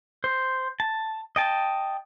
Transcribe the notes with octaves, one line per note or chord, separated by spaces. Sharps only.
C5
A5
D#5 G5 A5